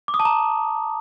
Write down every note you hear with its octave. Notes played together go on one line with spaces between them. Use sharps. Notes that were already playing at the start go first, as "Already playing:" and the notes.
D6
D#6
A5
A#5